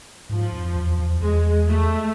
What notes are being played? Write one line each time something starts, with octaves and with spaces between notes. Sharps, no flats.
G#2 F3
F2
E2
E2
E2 G#3
A3